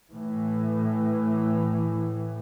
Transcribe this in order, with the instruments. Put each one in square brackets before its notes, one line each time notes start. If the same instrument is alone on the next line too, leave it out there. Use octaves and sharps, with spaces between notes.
[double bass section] A2 E3